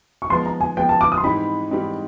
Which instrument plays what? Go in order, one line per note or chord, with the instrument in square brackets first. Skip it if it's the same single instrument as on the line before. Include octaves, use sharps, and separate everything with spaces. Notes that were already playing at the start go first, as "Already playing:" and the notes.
[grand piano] C#6
[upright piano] F3 G#3 B3 [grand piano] C6
[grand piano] A#5
G#5
[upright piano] F3 G#3 B3 [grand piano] G5
[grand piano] A5
D6
D#6
C6
[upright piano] G#2 E3 G3 C4 D#4 [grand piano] B5
[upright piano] G#2 E3 G3 C4 D#4